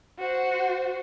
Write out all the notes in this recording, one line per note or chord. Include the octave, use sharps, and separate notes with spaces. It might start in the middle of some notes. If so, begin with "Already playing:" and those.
F#4 C5